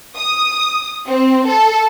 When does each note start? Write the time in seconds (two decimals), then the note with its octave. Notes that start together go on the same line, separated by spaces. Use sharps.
0.17 D#6
1.07 C4
1.48 A4